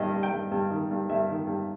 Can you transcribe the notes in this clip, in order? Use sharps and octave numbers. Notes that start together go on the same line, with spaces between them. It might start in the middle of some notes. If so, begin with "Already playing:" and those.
Already playing: G2 D#3 D#5
G2
G5
G2
G2
D#3
G2
G2 E5
D#3
G2